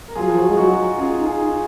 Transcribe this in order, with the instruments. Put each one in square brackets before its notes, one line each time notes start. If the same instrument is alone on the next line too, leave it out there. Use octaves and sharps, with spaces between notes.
[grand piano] A#4
[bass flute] F#3 [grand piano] F4 G#4
[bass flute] F3
F#3
G#3
[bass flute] F#3 [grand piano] D#4 F#4
[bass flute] C#4 [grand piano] F4 G#4
[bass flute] D#4
[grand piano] F4 G#4
[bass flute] D#4